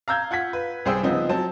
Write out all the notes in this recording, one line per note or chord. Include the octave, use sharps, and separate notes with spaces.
F5 A#5 E6 G6 G#6
F4 F#5 G#6 B6
B4
C2 G3 G#4 C5 G5 E6
C#3 F3 B3 C4 D#4
F#3 C4 A5